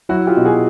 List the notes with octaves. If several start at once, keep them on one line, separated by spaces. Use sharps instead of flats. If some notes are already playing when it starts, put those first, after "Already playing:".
F#3 E4 F#4
F4 G4
B2
F#4 G#4